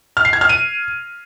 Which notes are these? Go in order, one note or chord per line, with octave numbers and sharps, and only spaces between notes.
F6
C7
G#6
F6
D#7